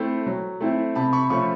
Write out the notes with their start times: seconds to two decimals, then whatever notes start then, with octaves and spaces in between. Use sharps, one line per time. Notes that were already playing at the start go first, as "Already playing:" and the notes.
Already playing: A3 C4 E4
0.26 F#3
0.60 A3 C4 E4
0.95 C3 A5 B5
1.13 B5 C#6
1.30 F3 A3 C#4 B5 C#6